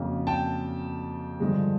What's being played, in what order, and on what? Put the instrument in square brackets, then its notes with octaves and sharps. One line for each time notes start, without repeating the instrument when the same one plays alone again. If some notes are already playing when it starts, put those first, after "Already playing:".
Already playing: [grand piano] F2 C#3 F#3 A#3
G5 A5
G2 D3 F3 G#3